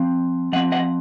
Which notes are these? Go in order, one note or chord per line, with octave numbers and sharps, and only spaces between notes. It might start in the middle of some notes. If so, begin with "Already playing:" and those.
Already playing: F3 C4
F3 C4 D#5 F#5
D#5 F#5